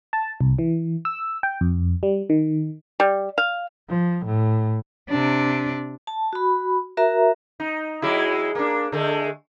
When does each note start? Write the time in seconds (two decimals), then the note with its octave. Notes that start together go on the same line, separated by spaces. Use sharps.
0.13 A5
0.41 C2
0.59 E3
1.05 E6
1.43 G5
1.61 F2
2.03 G3
2.30 D#3
3.00 G3
3.38 F5
3.89 F3
4.26 A2
5.10 C3 D4
6.07 A5
6.33 F#4 B5
6.97 F#4 A#4 E5 A#5
7.60 D#4
8.02 F#3 G#3 E4
8.55 A#3 D4
8.92 D3 G#3 A3